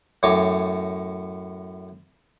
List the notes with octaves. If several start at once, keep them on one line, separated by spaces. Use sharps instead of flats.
F#2 A2 C#5 D6